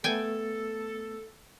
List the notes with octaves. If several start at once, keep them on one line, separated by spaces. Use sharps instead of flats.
A3 B3 A4 G5 G#5 A6